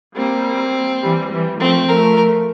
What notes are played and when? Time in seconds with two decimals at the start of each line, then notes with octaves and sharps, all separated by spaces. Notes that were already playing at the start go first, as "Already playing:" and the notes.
0.16 G3 A#3 C4
1.03 E3 G3
1.31 E3 G3
1.60 F3 A3 C4
1.89 F3 A3 A#4